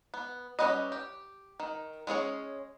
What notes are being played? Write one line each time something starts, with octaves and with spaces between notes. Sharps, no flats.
B3
G3 C#4 D#4 B4 D#5
G4
D#3
G#3 C#4 G#4 C#5